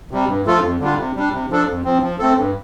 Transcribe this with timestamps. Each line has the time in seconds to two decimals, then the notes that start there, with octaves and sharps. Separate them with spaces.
0.11 C3 G3
0.28 G2
0.46 F3 A3 F4 A4
0.63 F2
0.80 D3 G3 D4 F4
0.98 C3
1.16 G3 D4
1.32 C3
1.50 F3 D4 A4
1.68 F2
1.84 F3 C4
2.02 F3
2.19 A3 C4 A4
2.37 G2